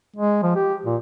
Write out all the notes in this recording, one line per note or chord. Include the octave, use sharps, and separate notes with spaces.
G#3
F3
G4
A#2